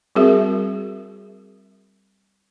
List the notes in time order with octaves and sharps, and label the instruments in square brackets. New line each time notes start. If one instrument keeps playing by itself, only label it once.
[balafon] G3 C4 F#4 G#4 A#4 E5